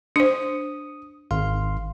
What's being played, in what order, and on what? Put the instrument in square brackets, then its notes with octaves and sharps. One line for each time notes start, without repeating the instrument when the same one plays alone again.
[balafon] D4 C5 [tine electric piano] D#6
[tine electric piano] G#1 F5 C6